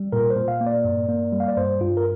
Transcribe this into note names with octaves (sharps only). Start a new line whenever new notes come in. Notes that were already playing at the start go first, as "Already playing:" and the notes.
Already playing: G3
A#2 A#4
C5
A#2
F5
A#3
D5
G2
A#3
G3
F5
D5
G2 C5
G2 F4
A#4